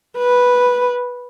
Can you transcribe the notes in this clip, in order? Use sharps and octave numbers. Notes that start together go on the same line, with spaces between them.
B4